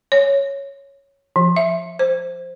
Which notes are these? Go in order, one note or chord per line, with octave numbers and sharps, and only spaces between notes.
C#5
F3
E5
C5